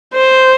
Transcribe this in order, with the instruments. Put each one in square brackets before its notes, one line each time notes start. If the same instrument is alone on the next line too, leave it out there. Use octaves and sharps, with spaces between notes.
[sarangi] C5